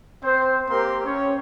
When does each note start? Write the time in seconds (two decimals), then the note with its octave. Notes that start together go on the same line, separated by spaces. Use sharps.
0.24 C4 C5
0.70 A#3 C4 G4 A#4 C6
1.05 C#4 C#5